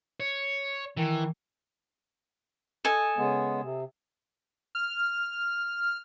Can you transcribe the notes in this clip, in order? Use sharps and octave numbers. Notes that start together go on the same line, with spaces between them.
C#5
D#3 E3
A4 D#5 G#5
C#3 G#3 B3
C3
F6